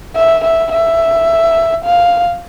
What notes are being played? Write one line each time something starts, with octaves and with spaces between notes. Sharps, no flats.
E5
E5
E5
F5